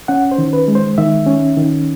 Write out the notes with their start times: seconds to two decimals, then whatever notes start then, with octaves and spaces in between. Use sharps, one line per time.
0.08 C#4 F#5
0.31 C5
0.38 D#3
0.53 B4
0.68 G#3
0.75 C5
0.98 D#3 E5
1.27 C#4
1.57 D#3